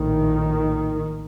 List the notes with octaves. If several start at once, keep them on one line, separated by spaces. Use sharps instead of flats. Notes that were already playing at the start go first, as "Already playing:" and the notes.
Already playing: A#1 A2 D#3